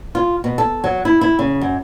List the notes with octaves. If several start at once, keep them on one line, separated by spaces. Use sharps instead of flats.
F4
B2
A4
F#3
E4
E4
C#3
F#2